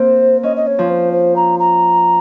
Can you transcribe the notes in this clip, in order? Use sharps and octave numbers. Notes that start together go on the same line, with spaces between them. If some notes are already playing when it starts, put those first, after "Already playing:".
Already playing: A#3 C4 C5
C#4 D#5
D#5
C#5
F3
C5
C5
A#5
A#5